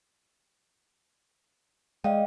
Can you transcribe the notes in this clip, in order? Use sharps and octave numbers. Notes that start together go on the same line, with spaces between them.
G#3 D5 D#5 F5 G5